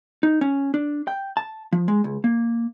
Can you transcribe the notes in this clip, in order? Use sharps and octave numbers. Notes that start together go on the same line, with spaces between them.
D#4
C#4
D4
G5
A5
F3
G#3
C#2
A#3